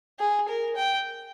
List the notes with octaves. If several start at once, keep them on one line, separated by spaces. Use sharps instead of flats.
G#4
A#4
G5